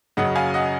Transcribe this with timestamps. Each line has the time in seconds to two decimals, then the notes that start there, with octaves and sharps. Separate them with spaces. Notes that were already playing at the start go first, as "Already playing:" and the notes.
0.17 F#2 C#3 F#3 C#4 D#5 F#5
0.36 F5 G#5
0.54 D#5 F#5